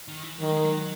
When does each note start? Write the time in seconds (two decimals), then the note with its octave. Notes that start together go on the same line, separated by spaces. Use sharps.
0.08 D#3
0.23 E3
0.40 D#3 F#3
0.52 G#3
0.63 F#3